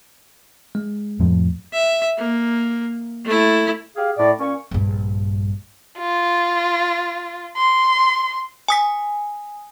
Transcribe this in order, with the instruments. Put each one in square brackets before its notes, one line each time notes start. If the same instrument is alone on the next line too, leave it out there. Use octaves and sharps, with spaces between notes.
[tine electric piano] G#3
[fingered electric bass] F2 A2 F3
[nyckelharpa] E5
A#3
A3 E4
[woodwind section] G4 G#4 F5
A2 D5
A#2 C#4 C#6
[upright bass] A#1 G2
[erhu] F4
C6
[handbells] G#5 D#6 B6